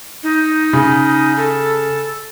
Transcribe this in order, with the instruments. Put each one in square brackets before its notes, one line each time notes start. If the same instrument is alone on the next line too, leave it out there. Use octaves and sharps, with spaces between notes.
[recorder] D#4
[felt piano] C#3
[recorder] A4